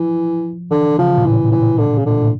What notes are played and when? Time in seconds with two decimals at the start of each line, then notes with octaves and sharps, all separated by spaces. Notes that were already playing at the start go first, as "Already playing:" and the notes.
Already playing: E3 F3
0.71 D3 E3
0.98 C#3 F3
1.17 A#2
1.24 A2 E3
1.52 A#2 E3
1.78 D3
1.98 C#3
2.06 A#2 D3
2.20 A2